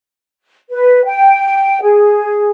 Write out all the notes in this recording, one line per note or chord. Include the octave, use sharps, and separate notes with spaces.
B4
G5
G#4